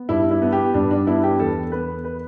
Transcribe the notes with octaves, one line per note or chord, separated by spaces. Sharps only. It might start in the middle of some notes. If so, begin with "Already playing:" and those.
Already playing: B3
G2 E4
E4
B3
G4
G2 D4
D4
B3 E4
G4
E2 A4
B3 B4
B4